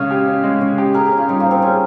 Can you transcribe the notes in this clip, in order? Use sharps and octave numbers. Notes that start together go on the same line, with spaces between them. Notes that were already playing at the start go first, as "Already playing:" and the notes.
Already playing: C#3 G#3 C#4 C#5 D#5 F5
G4
C#4
G#3
C#3 C#5
G4
G#4 A#4
A#4
C#4
F4
G3 D#4
A#3
C5
C4
C#4 G#4